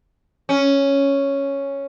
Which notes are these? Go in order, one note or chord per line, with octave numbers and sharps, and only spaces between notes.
C#4